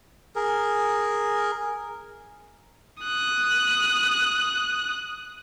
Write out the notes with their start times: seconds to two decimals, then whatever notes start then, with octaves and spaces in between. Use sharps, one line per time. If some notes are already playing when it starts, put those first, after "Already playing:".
0.36 G#4 A#4
3.03 D#6 F#6